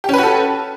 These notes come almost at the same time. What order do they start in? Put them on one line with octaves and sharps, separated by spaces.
G4 C#4 B4 F#4 A4